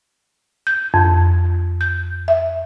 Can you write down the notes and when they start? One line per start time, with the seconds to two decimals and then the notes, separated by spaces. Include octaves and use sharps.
0.67 G6
0.94 F2
1.81 G6
2.28 E5